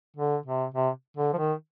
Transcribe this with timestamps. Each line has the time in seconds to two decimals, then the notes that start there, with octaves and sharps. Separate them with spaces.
0.16 D3
0.46 C3
0.74 C3
1.17 D3
1.33 F3
1.38 D#3